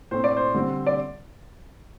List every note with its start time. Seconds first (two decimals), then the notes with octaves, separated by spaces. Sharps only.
0.11 A2 A3 C4 C5
0.24 D5
0.37 C5
0.54 D3 G3 C4
0.87 D5